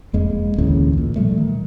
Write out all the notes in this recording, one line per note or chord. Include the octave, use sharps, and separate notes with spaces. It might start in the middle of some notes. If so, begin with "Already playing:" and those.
E1 F2 G#3 A#3
A1 D2 A#2 C#3
A#2
B2 F3 G3 A3
D#3